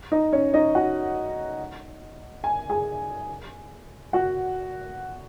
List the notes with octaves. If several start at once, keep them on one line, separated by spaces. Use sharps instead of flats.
D#4 D#5
C#4 C#5
D#4 D#5
F#4 F#5
G#5
G#4 G#5
F#4 F#5